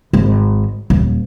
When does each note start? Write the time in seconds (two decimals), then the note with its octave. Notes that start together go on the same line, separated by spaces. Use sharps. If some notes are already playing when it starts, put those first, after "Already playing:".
0.13 G#1
0.90 D#1